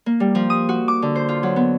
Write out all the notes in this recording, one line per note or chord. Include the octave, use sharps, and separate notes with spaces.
A#3
G3
F3
D#6
F#4
D6
D3
C5
F4
F#3
B3